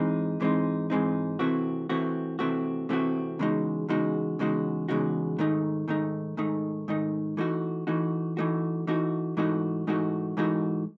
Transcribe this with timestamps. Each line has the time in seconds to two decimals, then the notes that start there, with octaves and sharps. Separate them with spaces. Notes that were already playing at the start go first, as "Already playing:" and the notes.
Already playing: G#2 E3 G#3 C4 D#4
0.40 G#2 E3 G#3 C4 D#4
0.90 G#2 E3 G#3 C4 D#4
1.39 C3 E3 A3 C4 F#4
1.89 C3 E3 A3 C4 F#4
2.39 C3 E3 A3 C4 F#4
2.89 C3 E3 A3 C4 F#4
3.39 E2 C#3 G#3 D#4 F#4
3.89 E2 C#3 G#3 D#4 F#4
4.39 E2 C#3 G#3 D#4 F#4
4.88 E2 C#3 G#3 D#4 F#4
5.38 G#2 D#3 A3 D#4
5.88 G#2 D#3 A3 D#4
6.37 G#2 D#3 A3 D#4
6.88 G#2 D#3 A3 D#4
7.37 E3 A3 D#4 F#4
7.87 E3 A3 D#4 F#4
8.37 E3 A3 D#4 F#4
8.87 E3 A3 D#4 F#4
9.37 G#2 E3 A3 D#4 F#4
9.87 G#2 E3 A3 D#4 F#4
10.37 G#2 E3 A3 D#4 F#4